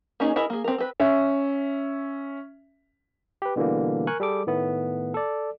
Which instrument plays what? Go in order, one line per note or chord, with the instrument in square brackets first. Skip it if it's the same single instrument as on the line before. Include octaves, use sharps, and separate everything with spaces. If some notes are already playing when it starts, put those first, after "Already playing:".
[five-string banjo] A#3 C#4 D#4 G#4
E4 G#4 A#4 D#5
A#3 G#4
C4 A#4
C4 B4
[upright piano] C#4 E5
[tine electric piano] G4 B4
B2 D3 E3 G3 A#3
A#4 G#5 C#6 F#6
G3 G#4 A4 D6
A2 D#3 A3 B3
A4 D5